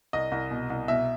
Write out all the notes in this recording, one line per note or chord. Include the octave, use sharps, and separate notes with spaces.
C2 D#5
C2
B2
C2
B2 E5